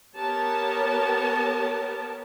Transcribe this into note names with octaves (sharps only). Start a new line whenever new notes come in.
B3 G4 A#4 C#5 A5